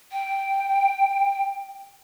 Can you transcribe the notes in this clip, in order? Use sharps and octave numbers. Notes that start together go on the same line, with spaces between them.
G5